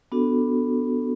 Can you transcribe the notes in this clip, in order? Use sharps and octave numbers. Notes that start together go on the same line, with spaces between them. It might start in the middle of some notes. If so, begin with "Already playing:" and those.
B3 D4 F#4 A4